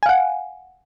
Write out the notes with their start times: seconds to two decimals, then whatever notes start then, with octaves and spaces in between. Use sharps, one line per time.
0.03 G#5
0.06 F5
0.09 F#5